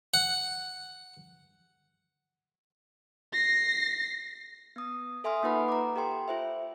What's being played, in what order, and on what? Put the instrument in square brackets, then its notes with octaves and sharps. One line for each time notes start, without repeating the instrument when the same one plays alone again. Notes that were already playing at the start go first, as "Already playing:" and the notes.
[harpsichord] F#5
[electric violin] A#6 C7
[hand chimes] B3 D#6
A4 E5 G#5 C6 D#6 F6
A#3 D#4 F4 B4 F#5 B5
A#5 D6
G4 A4 G5 C6
F4 C5 E5